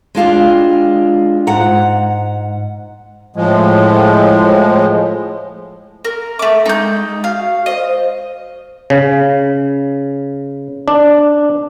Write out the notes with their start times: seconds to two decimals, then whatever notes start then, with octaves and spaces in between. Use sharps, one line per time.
0.15 G#3 D4 F4 G4
1.47 G#2 F#5 A#5
3.36 A2 F3 G#3
6.05 A#4
6.39 A3 E5 D6
6.66 G#3 D#4 G6
7.24 F#4 F5
7.66 C5 D#5
8.90 C#3
10.88 D4